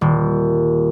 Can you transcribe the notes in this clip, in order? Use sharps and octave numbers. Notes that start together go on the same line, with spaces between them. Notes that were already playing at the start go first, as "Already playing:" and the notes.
D#1